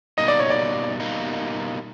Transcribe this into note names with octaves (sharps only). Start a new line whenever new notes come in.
B2 G3 A#3 D#4 D#5
D5
C#5
D5
B2 G3 A#3 D#4